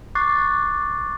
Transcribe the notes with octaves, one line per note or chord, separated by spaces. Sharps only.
C#6 D6 F#6 A6 C7